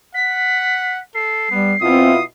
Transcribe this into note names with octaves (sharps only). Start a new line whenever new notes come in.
F#5 B6
A4 C7
G3 B3
B2 C4 E4 F4 D#6